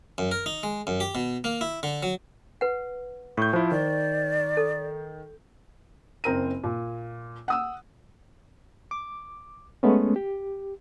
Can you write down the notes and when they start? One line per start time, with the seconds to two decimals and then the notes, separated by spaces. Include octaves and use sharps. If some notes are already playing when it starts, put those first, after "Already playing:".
0.18 F#2
0.31 A#4
0.46 D#4
0.63 G#3
0.87 F#2
1.00 G4
1.15 B2
1.44 A#3
1.61 E4
1.83 D3
2.03 F#3
2.61 B4 F#5
3.37 A2 C#6 G6
3.53 F3 E4 C5
3.72 D#3 D5
4.57 A4
6.24 F#1 C4 A#4 D#7
6.64 A#2
7.48 F#5 D#6 E6
8.91 D6
9.83 G#3 A3 B3 C#4
10.16 G4